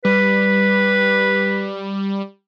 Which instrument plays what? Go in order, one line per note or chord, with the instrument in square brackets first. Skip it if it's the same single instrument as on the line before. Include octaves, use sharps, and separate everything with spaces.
[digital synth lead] G3 [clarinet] B4